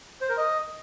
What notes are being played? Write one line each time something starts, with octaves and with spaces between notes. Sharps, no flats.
C5
A#4
D#5